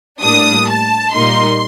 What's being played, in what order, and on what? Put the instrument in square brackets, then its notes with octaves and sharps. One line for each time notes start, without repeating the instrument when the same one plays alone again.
[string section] A2 G3 A#3 D4 D#6
A5
A#2 G3 A#3 D#4 C6